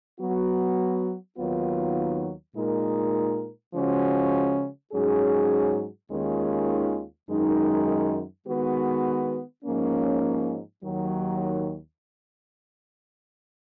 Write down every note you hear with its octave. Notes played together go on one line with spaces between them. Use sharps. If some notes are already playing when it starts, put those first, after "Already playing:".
F#3 B3 F#4
D#2 D#3 F#3 B3 F4
A#2 G#3 D#4 A#4
C#3 F3 G#3 C#4 F#4
G#2 F#3 C#4 G#4
D#2 D#3 G#3 C#4 F4
F#2 D#3 G#3 D#4
D#3 G#3 B3 F#4 B4
G#2 F3 A#3 C#4
D#2 D#3 F#3